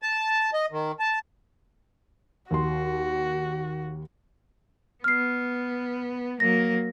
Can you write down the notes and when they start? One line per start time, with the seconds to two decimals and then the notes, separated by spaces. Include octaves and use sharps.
0.02 A5
0.53 D#5
0.72 D#3
1.00 A5
2.51 D#2 F#4 C6
5.04 B3 F6 C7
6.40 F#3 A#3 A#6